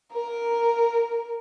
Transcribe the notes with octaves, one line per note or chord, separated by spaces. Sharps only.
A#4